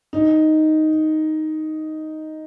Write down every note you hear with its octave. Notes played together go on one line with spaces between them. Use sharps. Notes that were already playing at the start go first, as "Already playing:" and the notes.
D#4